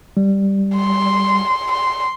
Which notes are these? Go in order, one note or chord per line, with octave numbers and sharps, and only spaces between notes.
G3
C6
C6